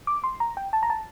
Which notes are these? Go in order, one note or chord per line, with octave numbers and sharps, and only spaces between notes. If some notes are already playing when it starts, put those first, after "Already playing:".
D6
C6
A#5
G5
A5
A#5
A5